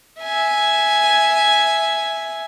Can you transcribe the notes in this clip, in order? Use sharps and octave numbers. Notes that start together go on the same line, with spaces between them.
E5 G#5